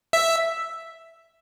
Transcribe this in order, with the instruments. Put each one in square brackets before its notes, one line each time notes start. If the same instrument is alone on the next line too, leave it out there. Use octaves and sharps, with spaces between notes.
[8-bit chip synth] E5